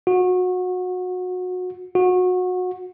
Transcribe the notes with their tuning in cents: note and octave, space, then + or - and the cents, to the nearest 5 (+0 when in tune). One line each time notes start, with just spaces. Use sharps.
F#4 -25
F#4 -25